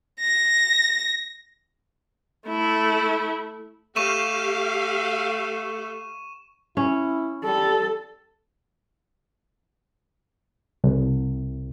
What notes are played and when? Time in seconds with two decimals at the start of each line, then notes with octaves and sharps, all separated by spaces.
0.20 A#6
2.48 A3 E4
3.96 A3 G4 F5 C#6 D#7 E7
6.77 C#4 E4
7.45 G3 A4
10.84 C2